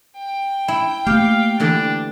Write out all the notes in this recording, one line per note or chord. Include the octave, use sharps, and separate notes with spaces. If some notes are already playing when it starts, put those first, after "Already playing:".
G5
E4
A3 A#3 G4 F5
D3 E3 D4 A4